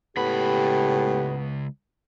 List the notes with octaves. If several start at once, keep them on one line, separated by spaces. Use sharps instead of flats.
C#2 A2 B3 G4 B5